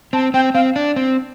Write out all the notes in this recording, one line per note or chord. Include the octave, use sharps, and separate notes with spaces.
C4 A5
C4 G5
C4 F5
D4
C4